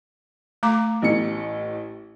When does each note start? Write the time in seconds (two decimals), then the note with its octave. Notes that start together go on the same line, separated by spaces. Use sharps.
0.63 A3 A#5 D6
1.02 A1 A2 C#7